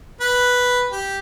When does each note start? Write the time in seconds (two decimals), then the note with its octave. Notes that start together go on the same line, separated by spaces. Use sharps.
0.20 B4
0.91 G4